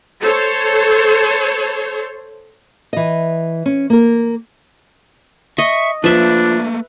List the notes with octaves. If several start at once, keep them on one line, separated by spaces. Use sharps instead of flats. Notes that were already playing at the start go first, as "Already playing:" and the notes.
A4 C5 C#5
E3 D#5
C#4
A#3 A#4
D#5 E5 C#6
F3 A3 A#3 D4 B4 E5